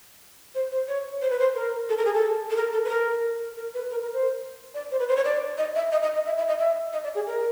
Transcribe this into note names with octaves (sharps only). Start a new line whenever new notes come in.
C5
C5
C#5
C5
B4
C5
A#4
A4
A#4
G#4
A4
A4
A#4
A4
B4
A#4
A#4
B4
A#4
A#4
C5
D5
C5
B4
C5
C#5
D5
D#5
E5
D#5
D#5
D#5
E5
E5
D#5
E5
D#5
D5
G#4
A#4